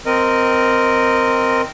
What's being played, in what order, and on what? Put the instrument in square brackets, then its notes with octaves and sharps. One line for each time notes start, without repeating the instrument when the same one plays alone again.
[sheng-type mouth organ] C4 A#4 D#5